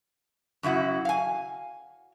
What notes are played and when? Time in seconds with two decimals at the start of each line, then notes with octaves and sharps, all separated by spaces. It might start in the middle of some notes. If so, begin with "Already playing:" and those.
0.63 F#2 C#3 E4 F#4
1.05 F5 G#5